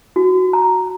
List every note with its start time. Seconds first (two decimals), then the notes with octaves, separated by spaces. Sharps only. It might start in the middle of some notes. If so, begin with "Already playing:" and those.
0.16 F#4
0.53 A#5